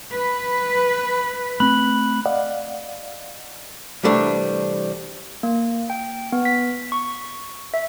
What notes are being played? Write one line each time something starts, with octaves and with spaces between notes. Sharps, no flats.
B4
A3 C4 B5 F#6 F#7
D5 D#5 F5 F#5
C2 E3 G3 A3 D4
A#3
G5
B3
B6
C#6
E5